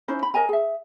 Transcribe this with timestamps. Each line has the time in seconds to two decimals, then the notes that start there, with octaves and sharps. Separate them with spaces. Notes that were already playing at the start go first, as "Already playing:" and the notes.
0.08 C#4 D#4 E4 C5
0.23 B5
0.34 A#4 D#5 G#5 A#5
0.49 G#4 E5